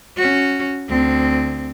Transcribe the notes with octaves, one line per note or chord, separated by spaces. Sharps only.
C#4 F#4
D2 C4